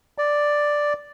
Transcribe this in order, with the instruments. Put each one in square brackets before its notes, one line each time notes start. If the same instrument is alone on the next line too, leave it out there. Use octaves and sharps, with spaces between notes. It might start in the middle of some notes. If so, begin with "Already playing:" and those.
[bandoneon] D5